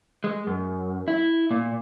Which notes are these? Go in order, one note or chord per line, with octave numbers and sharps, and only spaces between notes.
G#3
F#2
E4
A#2